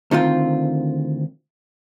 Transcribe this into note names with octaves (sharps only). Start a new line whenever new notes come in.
D2 D#3 C4 F4